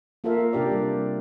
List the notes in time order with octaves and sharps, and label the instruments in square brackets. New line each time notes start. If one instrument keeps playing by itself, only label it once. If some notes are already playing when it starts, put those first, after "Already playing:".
[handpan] A#3 F4 A4 A#4 E5 F5
C3 D4 G4 A#4 D5
G3